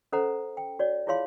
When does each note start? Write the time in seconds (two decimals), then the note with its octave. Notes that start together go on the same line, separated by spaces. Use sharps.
0.12 C#4 A4 C5 D#5 F#5 A#5
0.57 G5
0.79 F#4 C#5 D5
1.07 E4 F4 G#4 C#5 F5 C6